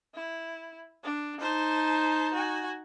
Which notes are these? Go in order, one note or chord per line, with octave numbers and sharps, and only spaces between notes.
E4
D4
D#4 C5 A5
F#4 G#5